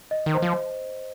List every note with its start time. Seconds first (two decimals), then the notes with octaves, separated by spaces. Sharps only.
0.11 D#5
0.26 D#3
0.34 C5
0.42 F3